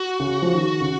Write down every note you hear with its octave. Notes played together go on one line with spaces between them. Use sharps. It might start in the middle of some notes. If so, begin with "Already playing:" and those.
Already playing: F#4
C#3
F3
D#3
C#3